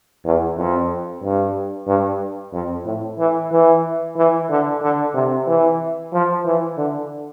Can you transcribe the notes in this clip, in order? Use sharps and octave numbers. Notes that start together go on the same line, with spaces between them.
E2
F2
G2
G2
F2
A2
E3
E3
E3
D3
D3
C3
E3
F3
E3
D3